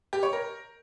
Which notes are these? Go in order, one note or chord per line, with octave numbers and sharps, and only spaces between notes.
G4
C#5
A#4